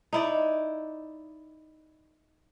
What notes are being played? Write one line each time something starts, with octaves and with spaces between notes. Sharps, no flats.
D#4 E4 D5